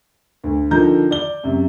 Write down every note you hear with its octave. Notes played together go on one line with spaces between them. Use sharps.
D2
D3 D#3 F3 A#5 G6
D5 G7
F#2 C3